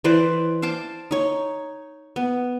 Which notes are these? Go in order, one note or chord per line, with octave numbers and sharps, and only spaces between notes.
E3 B4 C5 D5
C5 F5 A5 D6
D#4 C#5
B3